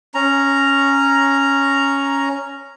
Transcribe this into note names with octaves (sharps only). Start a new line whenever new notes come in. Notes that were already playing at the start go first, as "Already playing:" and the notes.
C#4 A#5